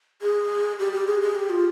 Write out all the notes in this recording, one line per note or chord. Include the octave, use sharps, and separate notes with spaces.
G#4
G4
G4
G#4
G#4
G4
F4